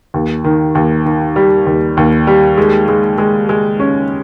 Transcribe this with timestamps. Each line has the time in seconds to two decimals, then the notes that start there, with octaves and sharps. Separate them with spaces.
0.14 D#2
0.44 D#3
0.75 D#2
1.06 D#3
1.36 G3
1.66 D#2
1.97 D#2
2.27 G3
2.57 G#3
2.88 G#3
3.18 G#3
3.49 G#3
3.80 C#4